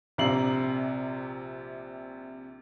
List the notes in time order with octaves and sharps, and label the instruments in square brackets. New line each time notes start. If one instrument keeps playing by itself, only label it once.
[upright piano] A#1 C3 D5 A#5 C7 F#7